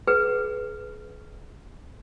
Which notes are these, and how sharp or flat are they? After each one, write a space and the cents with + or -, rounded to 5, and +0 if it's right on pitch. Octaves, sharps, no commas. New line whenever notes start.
G#4 +30 B4 +5 F#5 +30